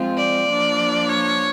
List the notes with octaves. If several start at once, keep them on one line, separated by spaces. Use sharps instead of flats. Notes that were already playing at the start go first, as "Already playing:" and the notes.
Already playing: F3 G#3 C4 F4
D5
F3 A#3 D4
C#5